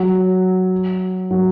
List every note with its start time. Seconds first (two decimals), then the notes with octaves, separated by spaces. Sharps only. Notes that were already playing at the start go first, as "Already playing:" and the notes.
Already playing: F#3
1.31 F#3